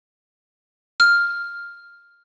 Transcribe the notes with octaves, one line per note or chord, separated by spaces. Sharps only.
F6